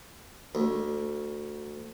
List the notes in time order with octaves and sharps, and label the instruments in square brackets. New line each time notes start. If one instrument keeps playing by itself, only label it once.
[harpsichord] D2